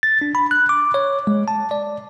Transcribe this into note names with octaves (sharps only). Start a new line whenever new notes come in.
A6
D4
B5
F#6
D6
C#5
G#3
A5
D5